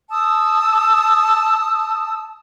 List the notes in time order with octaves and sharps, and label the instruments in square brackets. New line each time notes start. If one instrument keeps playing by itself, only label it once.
[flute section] A5 D#6 E6